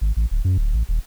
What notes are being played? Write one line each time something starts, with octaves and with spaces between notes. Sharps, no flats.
G#1
A1
D1
F#2
D1
A1
D#1